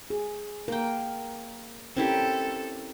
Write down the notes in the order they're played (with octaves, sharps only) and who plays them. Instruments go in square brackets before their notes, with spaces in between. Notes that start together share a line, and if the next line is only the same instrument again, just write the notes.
[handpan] G#4
[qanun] A#3 G5 [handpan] A#4
[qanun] C4 E4 G4 [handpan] C#4 A#4 [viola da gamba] A4